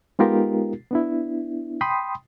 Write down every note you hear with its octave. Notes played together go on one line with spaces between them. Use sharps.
G#3 B3 D#4 F4 G4 A#4
B3 D4 E4
G5 B5 C6 D#6